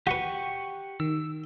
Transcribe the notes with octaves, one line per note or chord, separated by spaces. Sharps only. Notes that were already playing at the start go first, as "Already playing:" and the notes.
F#4 G4 B4 F#5 C#6
D#3 E6